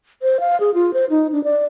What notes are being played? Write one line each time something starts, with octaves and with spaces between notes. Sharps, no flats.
C5
F5
G#4
F4
C5
D#4
D4
D5